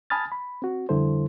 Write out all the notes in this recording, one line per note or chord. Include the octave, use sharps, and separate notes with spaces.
G#5 A5 B5 D#6 F6 A6
B5
C4 F#4
F2 D3 G3 E4 A4 C5